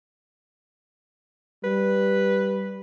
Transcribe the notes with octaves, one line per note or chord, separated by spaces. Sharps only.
G3 B4